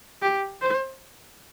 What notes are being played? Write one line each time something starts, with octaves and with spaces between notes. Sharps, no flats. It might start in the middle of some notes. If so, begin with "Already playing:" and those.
G4
C5